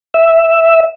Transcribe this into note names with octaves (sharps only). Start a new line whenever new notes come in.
E5